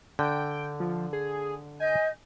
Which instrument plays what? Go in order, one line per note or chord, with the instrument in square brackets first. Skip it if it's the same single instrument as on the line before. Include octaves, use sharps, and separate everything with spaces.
[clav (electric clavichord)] D3 [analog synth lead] G5
[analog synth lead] F3
G#4
[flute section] D#5 G6 [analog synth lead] G#5